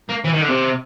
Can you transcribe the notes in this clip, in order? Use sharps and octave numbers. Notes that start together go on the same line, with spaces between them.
A#3
E3
D#3
D3
C3